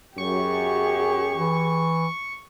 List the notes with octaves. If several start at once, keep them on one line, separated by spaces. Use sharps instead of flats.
F#2 G4 G#4 C#6
E3